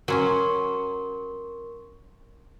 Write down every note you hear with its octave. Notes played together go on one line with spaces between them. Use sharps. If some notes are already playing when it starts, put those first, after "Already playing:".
F#3 C#4 A#4 C6 C#6